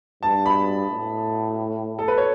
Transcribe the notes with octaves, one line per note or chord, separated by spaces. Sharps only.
G2 A5
B5
A2
A4
B4
C#5